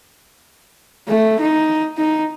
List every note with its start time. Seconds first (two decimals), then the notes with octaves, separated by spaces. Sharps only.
1.08 A3
1.40 D#4
1.98 D#4